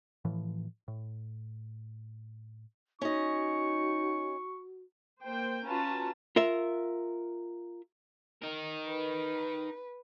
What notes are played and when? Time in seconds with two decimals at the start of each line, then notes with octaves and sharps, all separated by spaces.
0.25 A2 E3 F3
0.88 A2
3.01 C#4 D#4 F#4 D#5 C#6
5.24 A#3 C5 G5
5.65 C#4 F4 F#4 B4 A5 A#5
6.36 F4 A#4 E5
8.42 D#4 A#4
8.88 B4